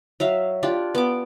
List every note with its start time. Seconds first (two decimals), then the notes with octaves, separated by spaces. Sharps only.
0.20 F#3 E5 F5
0.63 D4 F4 G4
0.95 B3 D6